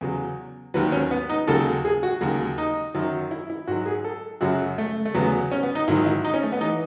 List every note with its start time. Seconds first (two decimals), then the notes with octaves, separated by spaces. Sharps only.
0.01 E2 C#3 F#3
0.74 D#2 D#3 F#3 B4
0.92 C#4
1.11 B3
1.29 D#4
1.47 D#2 C#3 F#3 A4
1.85 G#4
2.03 F#4
2.21 D#2 C#3 F#3
2.58 D#4
2.94 F#2 D#3 F#3
3.31 E4
3.50 E4
3.68 G#2 F#3 F#4
3.86 G#4
4.04 A4
4.41 F#2 C#3 F#3 F#4
4.78 A3
5.05 A3
5.14 E2 C#3 F#3 B3
5.52 C#4
5.63 B3
5.75 D#4
5.88 G#2 D#3 F#3 E4
6.06 E4
6.25 D#4
6.34 C#4
6.43 A3
6.52 B3
6.61 E3 D#4